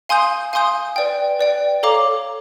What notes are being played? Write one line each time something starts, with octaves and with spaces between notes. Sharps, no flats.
F5 G#5 C6 D#6 G6
F5 G#5 C6 D#6 G6
B4 D5 G5
B4 D5 G5
A4 C#5 F5 A#5 D6